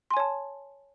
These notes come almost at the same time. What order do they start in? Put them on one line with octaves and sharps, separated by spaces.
C6 G#5 C#5 A5